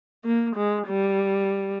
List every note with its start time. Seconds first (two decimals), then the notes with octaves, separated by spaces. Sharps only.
0.25 A#3
0.56 G#3
0.87 G3